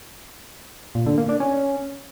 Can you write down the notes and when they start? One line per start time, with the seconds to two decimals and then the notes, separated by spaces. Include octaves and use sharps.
0.95 A#2
1.06 D3
1.18 A#3
1.29 D4
1.40 C#4